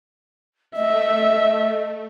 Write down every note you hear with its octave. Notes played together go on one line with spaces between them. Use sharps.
A3 D#5 E5